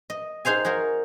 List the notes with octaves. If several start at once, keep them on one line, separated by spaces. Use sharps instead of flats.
D#5
D#4 G#4 C5 F5 G#5
F#4 G#4 A#4 C5